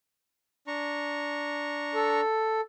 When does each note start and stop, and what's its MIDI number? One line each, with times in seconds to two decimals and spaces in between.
0.67 2.21 62
0.67 2.21 82
0.67 2.21 85
1.95 2.61 69